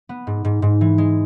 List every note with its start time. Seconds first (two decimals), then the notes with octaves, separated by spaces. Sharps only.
0.09 B3
0.27 G#2
0.45 G#2
0.62 G#2
0.81 E3
0.98 G#3